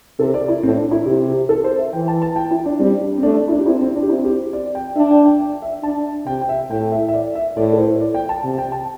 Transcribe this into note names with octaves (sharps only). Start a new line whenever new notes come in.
C3 A4
D5
E4
A2 C4
D4
E4
C3 G4
G4
A4
C5
E5
E3 G5
A5
A5
G5
E4
D4
G3 C4
D4
C4
A3 D4
E4
D4
G4
C4 E4
C4
D4
G4
C4 E4
G4
D5
G5
D4 E5
G5
G5
G5
E5
D4 A5
C3 G5
G5
E5
A2 G5
E5
E5
D5
E5
A2 D5
A4
C5
D5
G5
A5
C3
G5
A5